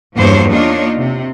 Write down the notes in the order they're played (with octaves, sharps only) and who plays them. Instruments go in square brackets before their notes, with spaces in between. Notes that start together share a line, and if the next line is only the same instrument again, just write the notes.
[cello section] E2 G2 F3 A#3 C5 C#5
A#3 D4 D#4 F4 C#5
C3